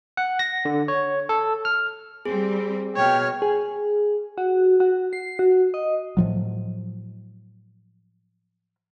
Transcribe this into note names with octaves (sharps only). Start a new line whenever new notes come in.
F#5
A#6
D3
C#5
A4
F6
G3 C4 G#4
B2 C#5 G5 F6
G#4
F#4
F#4
C7
F#4
D#5
A2 F3 F#3